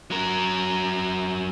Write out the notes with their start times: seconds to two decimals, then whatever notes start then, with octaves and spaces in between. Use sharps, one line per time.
0.11 F#3 A#4